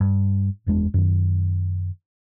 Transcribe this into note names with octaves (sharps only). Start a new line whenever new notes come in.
G2
F#1 E2 G#3 D4
F#2 D#3